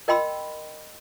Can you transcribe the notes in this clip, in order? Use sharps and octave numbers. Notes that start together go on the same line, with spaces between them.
A#4 D#5 G5 B5 C6 E6